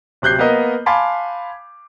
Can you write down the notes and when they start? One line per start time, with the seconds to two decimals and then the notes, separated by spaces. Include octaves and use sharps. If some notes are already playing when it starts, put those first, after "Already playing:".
0.22 D1 C3 F#6 G6 C7
0.38 A#3 B3 A#4 D#5
0.86 F5 G#5 A5 B5 C6 D6